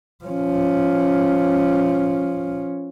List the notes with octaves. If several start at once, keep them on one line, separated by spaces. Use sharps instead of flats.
F3 C#4